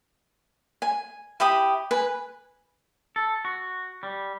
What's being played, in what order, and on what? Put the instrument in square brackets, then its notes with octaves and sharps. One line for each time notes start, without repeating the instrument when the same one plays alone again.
[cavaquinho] G#5
E4 G4 B5 D#6
B4 G#5
[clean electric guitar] A4
F#4
G3